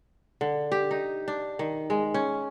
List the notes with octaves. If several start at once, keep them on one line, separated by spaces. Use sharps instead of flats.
D3
G4
D#4
D4
D#3
G#3
C#4